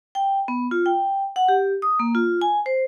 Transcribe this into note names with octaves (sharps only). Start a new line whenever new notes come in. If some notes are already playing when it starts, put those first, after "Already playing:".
G5
B3
F4
G5
F#5
G4
D#6
A#3
F4
G#5
C5